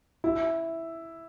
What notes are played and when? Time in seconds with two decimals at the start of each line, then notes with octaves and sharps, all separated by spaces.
0.24 E4